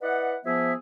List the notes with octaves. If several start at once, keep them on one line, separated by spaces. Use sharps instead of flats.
E4 B4 D5 D#5 F#5
F3 B3 G#4 E5